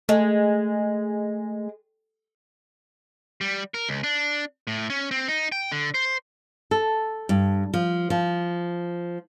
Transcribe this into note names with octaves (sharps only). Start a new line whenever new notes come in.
G#3 A3
G3
A#4
C#2
D4
A2
C#4
C4
D#4
G5
D3
C5
A4
G2
F3
F3